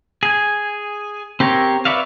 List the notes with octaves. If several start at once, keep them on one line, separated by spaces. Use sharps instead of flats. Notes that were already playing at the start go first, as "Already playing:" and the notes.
G#4 G#5
C4 G4 A#4 C#5
B4 C#5 D5 E5 F5